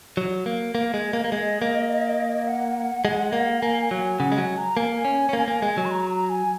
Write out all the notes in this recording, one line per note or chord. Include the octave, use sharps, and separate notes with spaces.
F#3
A#3
A#3
G#3
A#3
A#3
G#3 D#5
A#3
F#5
G#3
A#3
A#3 G#5
G#5
F#3
G#5
C#3 F#5
G#3
F#3 G#5
A#5
A#3 G#5
C#4
C#4
A#3
A#3
G#3
F#3
C#6
A#5
A#5
G#5